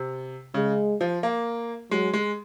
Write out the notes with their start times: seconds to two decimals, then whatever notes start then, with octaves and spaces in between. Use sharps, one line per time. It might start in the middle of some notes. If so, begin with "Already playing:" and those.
Already playing: C3
0.54 C#3 G#3
1.01 F3
1.23 A#3
1.91 F#3 G#3
2.13 G#3